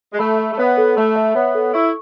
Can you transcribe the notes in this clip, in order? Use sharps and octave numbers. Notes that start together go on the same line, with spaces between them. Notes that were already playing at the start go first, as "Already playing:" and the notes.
G#3
A3 B5
E5
A3
B3 C#5
A4
A3 B5
E5
B3 C#5
A4
E4 C#6